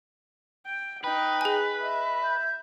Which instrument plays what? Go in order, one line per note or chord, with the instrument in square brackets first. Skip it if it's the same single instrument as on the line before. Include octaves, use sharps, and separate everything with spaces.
[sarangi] G5
[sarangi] D#4 [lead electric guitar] B4 [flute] G5
[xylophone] G#4 G#5
[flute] D#5 [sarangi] E5
[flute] G6